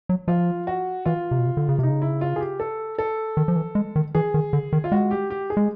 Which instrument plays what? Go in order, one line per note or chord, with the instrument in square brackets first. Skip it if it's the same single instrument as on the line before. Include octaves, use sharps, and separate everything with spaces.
[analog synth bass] F#3
[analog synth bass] F3 [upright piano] F4
[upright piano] F#4
[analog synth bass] E3 [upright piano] F4
[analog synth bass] C3
B2
C3
D3
C#3
[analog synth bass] C3 [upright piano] D#4
[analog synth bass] C#3
[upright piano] E4
F4
G#4
G4
A4
A4
[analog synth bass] D#3
F3
E3
G#3
D#3
[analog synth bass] E3 [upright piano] G#4
[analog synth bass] D#3
D3
D#3
[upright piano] F4
[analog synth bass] G#3 [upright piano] F#4
[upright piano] G4
G4
G#4
[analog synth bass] G#3